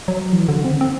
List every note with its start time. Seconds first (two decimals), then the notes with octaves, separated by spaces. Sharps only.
0.08 F#3
0.32 E3
0.48 D3
0.65 C4
0.81 C4